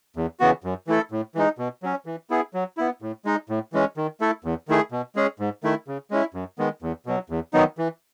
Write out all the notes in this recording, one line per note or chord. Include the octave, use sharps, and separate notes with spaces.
E2
C#3 E3 B3 F#4
F#2
E3 A3 E4 A4
A2
E3 G#3 D#4
B2
F#3 C#4
E3
B3 E4 G#4
F#3
B3 E4
A2
G#3 D#4
A2
E3 G#3 C#4
D#3
A3 E4 A4
E2
D#3 A3 E4 G#4
B2
G#3 C#4 G#4
G#2
D#3 A3 E4
C#3
G#3 C#4 E4
F#2
D#3 G#3 B3
E2
B2 F#3
E2
D#3 F#3 B3 D#4
E3